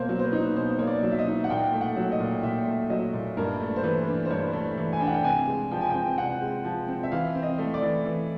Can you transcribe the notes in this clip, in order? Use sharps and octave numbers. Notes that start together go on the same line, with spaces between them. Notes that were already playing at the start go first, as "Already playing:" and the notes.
Already playing: B2 A#3 C5 C#5
F#3
C5
B4
D#4
B2 C5
A#3 C#5
D5
F#3
E5
D#5
D#4
F#5
A#2 G5
A3
F#5
F#3
D#5
A#2
A#2 E5
A3
F#3 D#5
A#2
G2 A#4
A3
C5
E3 B4
D4
C5
G2 C#5
A3
E3
G#5
D4 G5
F#5
G5
C3 G#5
G#3
F3 G5
G#5
C4 G5
C3 F#5
G#3
F3
C4
E5
E3 F5
C4
D#5
A3
D5
E3
E3